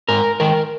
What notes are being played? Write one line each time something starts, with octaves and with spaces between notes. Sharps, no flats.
G#2 A#4
D#3 G#3 A#4